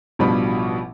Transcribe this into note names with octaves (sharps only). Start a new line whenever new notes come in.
A1 B2 F3 G3 D4 B5